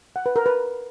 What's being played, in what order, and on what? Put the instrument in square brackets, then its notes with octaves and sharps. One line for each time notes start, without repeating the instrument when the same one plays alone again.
[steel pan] F#5
B4
A#4
B4